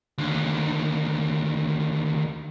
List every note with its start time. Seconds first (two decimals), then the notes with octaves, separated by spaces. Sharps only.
0.18 D#2 D3